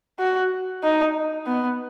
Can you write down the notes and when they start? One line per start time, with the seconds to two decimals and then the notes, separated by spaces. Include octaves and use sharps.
0.19 F#4
0.83 D#4
1.46 B3